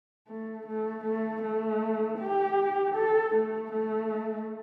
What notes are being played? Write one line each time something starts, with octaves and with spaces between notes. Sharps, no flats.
A3
A3
A3
A3
G4
A4
A3
A3